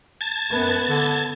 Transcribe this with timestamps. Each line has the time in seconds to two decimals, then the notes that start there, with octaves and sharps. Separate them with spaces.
0.21 A5 G#6 A6
0.52 F#2 B3
0.88 D3